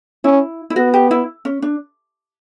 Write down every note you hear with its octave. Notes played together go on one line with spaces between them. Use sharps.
C#4 E4
E4
B3 F#4
G4
E4
C#4
D4